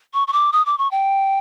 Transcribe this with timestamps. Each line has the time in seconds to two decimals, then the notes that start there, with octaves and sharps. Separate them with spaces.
0.14 C#6
0.28 C#6
0.33 D6
0.53 D#6
0.66 D6
0.78 C#6
0.91 G5